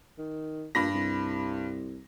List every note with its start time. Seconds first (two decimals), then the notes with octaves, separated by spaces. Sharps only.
0.18 D#3
0.75 G2 A#2 B5 A#6
0.94 C2